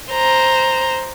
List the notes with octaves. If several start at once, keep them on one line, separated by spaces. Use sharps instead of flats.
C5 A#5